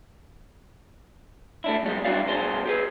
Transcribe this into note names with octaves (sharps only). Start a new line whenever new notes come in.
A3 D4 E4
F#2 B2 G3 G#3
G3 D4 E4 F#4 D5 F5
G2 B2 G#4 C5 D5 C6
G4 G#4 B4